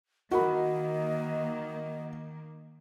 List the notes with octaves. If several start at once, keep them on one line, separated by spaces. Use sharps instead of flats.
D#3 A#3 F#4 A#4 D#5 B5